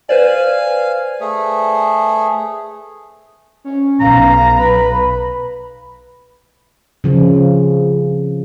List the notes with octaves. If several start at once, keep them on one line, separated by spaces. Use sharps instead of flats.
B4 C5 D5 F5 G#5
A3 G#4
C#4
B1 F5 A#5
B4 B5
C#3 F3